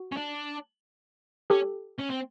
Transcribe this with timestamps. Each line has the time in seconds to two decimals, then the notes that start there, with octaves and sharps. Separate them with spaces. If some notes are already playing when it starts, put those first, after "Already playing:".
Already playing: F#4
0.12 C#4
0.16 D4
1.50 C#4 G4 A4
1.99 C#4
2.10 C4